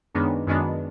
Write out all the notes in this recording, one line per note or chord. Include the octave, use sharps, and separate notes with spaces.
F#2 D#3 G#3 B3 D4
F#2 D#3 G#3 B3 D4